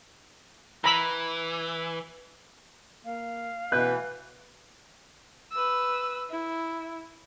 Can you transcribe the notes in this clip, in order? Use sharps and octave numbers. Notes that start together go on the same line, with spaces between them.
E3 A#5 B5 E6
A#3 F5
B2 E3 B4 F#6 G6
B4 E6
E4